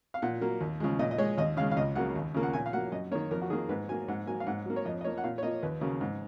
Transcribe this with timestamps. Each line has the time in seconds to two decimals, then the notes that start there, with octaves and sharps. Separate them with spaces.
0.14 F5
0.22 A#2 F#5
0.41 F#3 A#3
0.61 D#2
0.80 C#3 F3 G#3
0.99 A#2 D#5
1.11 D#5
1.18 G#3 C#5
1.38 D#2 D#5
1.57 C#3 G#3 F5
1.71 F5
1.77 C#2 D#5
1.95 C#3 F#3 A#3 F#5
2.16 D#2
2.34 C#3 F3 A#3
2.43 F#5
2.53 A#2 G#5
2.66 F5
2.73 F#3 A#3 F#5
2.92 F#2 D#5
3.11 A#3 C#5
3.15 D#3
3.31 F2 A#4
3.42 F#4
3.50 D#3 A#3 G#4
3.69 G#2 B4
3.89 F#3 A#3 G#5
4.08 G#2 F#5
4.27 F#3 A#3 G#5
4.40 F5
4.47 G#2 F#5
4.66 F#3 A#3
4.76 C#5
4.85 F2 D#5
5.01 D#5
5.04 F3 A#3 C#5
5.18 F#5
5.24 A#2 F5
5.38 C#5
5.43 F3 A#3 D#5
5.62 D#2 B4
5.81 C#3 F#3 A#3
6.01 G#2